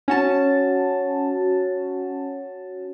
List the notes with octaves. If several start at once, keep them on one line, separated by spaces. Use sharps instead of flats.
C#4 F#4 A5